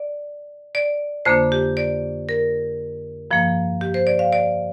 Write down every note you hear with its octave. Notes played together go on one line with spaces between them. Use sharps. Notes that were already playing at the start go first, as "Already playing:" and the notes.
Already playing: D5
D5
F2 D3 A#3 D4 C5
G4
D5
A#4
G2 F3 A#3
G4
C5
D5
F5
D5